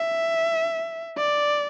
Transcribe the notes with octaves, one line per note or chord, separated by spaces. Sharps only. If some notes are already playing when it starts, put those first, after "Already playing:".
Already playing: E5
D5